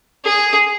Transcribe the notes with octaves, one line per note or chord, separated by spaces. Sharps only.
G#4